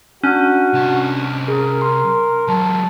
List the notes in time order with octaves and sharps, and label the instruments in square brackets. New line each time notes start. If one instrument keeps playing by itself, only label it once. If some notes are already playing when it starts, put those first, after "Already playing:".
[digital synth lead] C#4 [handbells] D4 F#6 G6 [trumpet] F#4
[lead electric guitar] C2 A5
[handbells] G#4 [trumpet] A#4
[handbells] C6
[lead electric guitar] F#3 G#3 [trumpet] A5